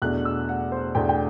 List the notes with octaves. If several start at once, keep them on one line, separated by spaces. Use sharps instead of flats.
E2 B2 A3 D4 F#6
E6
F#5
C5
E2 B2 A3 D4 G5
G5